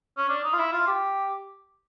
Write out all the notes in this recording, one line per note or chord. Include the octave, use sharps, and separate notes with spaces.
C#4
D4
D#4
F4
E4
F4
G4